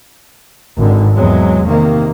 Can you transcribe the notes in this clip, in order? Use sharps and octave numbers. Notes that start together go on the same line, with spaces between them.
G#1 D3
E2 C3 F#3 G#3
C3 D#3 A#3